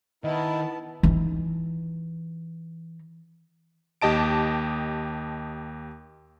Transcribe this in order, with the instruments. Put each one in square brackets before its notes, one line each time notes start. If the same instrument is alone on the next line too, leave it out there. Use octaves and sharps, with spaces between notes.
[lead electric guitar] D#3 [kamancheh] B3 A5 [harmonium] E4 [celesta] D#5
[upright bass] E3 D#4
[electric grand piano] D#2 G4 D#5 A5 D7